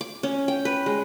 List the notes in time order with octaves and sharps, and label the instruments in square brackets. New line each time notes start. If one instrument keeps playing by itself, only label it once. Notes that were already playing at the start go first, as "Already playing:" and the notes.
[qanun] D6
C#4
G5
B4
G#3